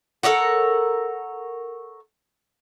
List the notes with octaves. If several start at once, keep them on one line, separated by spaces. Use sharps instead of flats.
A4 A#4 C#5 F#5